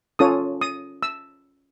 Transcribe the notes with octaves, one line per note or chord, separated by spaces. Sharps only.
C#4 F4 A4 C#5 D#6
D#6
E6